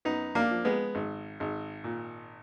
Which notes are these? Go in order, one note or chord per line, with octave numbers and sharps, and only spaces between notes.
F#2 B3 D#4
A#3 D4
F3
G#3 B3
G#1
G#1
A#2